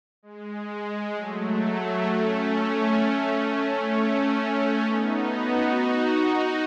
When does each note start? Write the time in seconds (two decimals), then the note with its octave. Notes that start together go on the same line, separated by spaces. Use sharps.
0.23 G#3
0.68 G#3
1.15 F#3 A3
2.07 A3 C#4
3.92 A3 C#4
4.38 A3 C#4
4.83 B3 D#4
5.30 D#4 F#4
6.22 D#4 F#4